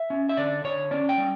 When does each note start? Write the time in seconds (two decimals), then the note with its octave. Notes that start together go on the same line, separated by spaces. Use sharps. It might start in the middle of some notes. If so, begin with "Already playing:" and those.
Already playing: E5
0.10 C#4
0.29 E5
0.37 D3 D5
0.64 D3 C#5
0.91 C#4 D5
1.09 G5
1.18 G3